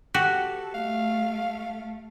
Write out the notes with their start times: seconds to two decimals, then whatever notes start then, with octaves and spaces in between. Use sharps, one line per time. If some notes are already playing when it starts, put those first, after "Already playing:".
0.14 F#4 G4 A4
0.74 A3 F5